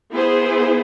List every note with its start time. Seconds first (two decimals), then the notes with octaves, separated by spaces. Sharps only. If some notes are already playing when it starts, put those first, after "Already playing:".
0.12 B3 E4 G#4 C5